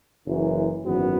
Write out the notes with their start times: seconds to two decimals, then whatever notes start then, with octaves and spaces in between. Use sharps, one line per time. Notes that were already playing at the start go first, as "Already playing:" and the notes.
0.25 F#1 F#2 E3
0.85 G#1 F#2 E3 B3 F#4